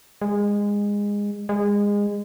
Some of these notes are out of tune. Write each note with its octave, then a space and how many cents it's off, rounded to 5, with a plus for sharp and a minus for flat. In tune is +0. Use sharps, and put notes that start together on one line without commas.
G#3 -20
G#3 -25